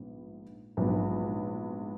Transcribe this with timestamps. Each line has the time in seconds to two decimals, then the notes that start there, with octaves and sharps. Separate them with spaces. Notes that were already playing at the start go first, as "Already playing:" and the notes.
Already playing: A#1 G#2 B3
0.77 A#1 G#2 F#3 B3